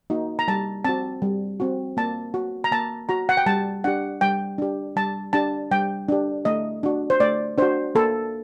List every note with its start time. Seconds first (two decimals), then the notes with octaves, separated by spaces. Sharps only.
0.10 A#3 D#4 F#4
0.39 A#5
0.48 G3 A5
0.85 C4 F#4 A5
1.22 G3
1.60 C4 F#4
1.97 A#3 A5
2.34 F#4
2.64 A#5
2.72 A#3 A5
3.09 F#4 A#5
3.29 F#5
3.37 G5
3.46 G3 A5
3.84 D4 G4 F#5
4.21 G3 G5
4.58 D4 G4
4.96 G3 A5
5.33 D4 G4 A5
5.71 G3 G5
6.08 D4 G4
6.45 A3 D#5
6.83 D4 F#4
7.10 C5
7.20 A3 D5
7.58 D4 F#4 C5
7.95 A#3 A4